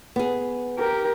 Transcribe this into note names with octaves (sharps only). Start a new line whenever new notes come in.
B3 G#4
G4 A#4